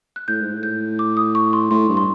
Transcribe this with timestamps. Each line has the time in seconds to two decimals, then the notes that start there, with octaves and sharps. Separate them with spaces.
0.16 F#6
0.28 A2 G6
0.41 G#2
0.54 A2
0.63 G6
0.99 D6
1.17 D#6
1.35 C#6
1.53 C6
1.71 A2 C6
1.89 G2
1.97 C6